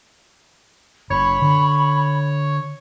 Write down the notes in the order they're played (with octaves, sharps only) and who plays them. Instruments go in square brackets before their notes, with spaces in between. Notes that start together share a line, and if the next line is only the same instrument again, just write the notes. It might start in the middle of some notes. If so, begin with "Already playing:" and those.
[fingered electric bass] F#1 [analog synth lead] C#5 [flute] B5
[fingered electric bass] D3